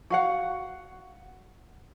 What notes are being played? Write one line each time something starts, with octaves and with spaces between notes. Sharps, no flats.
F#4 F5 F#5